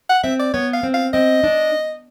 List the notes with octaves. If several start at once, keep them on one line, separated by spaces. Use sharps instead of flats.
F#5
C4 E5
D5
B3 C#5
F5
C4
F5
C4 D#5
D4